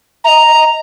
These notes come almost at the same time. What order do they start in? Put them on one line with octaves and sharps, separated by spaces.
E5 A#5 D#5